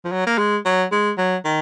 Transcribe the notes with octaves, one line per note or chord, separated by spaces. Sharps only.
F3
F#3
A#3
G#3
F#3
G#3
F#3
D#3